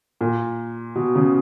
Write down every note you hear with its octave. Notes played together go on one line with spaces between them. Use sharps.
A#2
B2
C#3